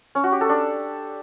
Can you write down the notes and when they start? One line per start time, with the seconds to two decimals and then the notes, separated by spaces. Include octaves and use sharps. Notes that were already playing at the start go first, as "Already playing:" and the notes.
0.15 C#4
0.24 F#4
0.32 G4
0.41 A4
0.49 D4